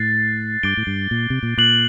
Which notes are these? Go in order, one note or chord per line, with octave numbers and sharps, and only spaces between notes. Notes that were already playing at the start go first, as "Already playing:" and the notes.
Already playing: A2 F#6 A6 C7
G2 D6 G6 D7 G7
A2
G2
A#2
C3
A#2
A#2 D6 F#6 C7 F#7